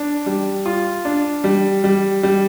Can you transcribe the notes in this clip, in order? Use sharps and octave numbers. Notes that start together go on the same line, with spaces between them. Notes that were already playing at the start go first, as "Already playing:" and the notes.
Already playing: D4
G3
F4
D4
G3
G3
G3